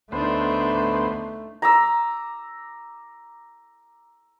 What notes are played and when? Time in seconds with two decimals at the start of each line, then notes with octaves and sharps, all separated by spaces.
0.12 D2 A3 B3 D4 D#4 C5
1.62 A#5 D6 E6